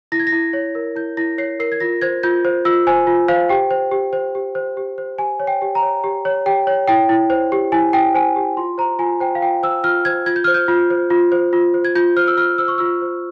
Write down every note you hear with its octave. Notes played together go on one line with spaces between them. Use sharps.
E4 A#6
G#6
A#6
E4
C#5
A#4
E4 G6
E4 A#6
C#5 C7
A#4 C7
G#6
F4 A#6
C5 G#6
F4 G6
C5
F4 E6
C5 G#5
F4
C5 F5
G4 G5
C5
G4
C5
G4
C5
G4
C5
G4 G#5
C#5
G5
G4
A#5
C#5
G4
C#5
G4 G5
C#5
E4 G5
E4
C5
G4
E4 G#5
E4 G5
C5 G#5
G4
F4 C6
C5 A#5
F4 G#5
C5 G5
F5
F4 G5
C5 E6
F4 F6
C5 G#6
F4 G#6
G6
C5 F6
G6
F4
C5
F4
C5
F4
C5
G#6
F4 G6
C5 F6
E6
F4 F6
C5 E6
C#6
F4 E6
C5